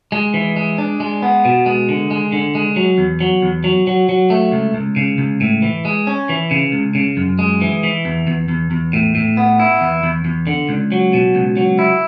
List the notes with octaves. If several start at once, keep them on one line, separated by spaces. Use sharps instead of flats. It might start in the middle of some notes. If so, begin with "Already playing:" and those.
G#3
E3
G#3
D4
G#3
B3
B2
G#3
D3
G#3
D3
G#3
F#3
E2
F#3
E2
F#3
F#3
F#3
A3
C#2
C#2
C#3
C#2
A2
E3
G#3
C#4
E3
C#3
C#2
C#3
F#2
G#3
E3
E3
E2
E2
E2
E2
A2
A2
B3
E4
E2
E2
E2
D3
C#2
F#3
B2
C#2
F#3
E4